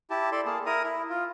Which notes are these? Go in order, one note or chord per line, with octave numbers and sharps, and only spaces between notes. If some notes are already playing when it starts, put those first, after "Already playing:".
E4 G4 A5
A4 D5 C6
A#3 G#4 A5
E4 A#4 A#5 D#6
E4
F4